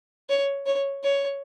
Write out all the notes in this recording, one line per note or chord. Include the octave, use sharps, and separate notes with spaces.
C#5
C#5
C#5